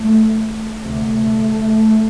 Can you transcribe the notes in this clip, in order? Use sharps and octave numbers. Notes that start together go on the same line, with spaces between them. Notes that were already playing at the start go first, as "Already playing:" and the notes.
Already playing: A3
D2 C3 A3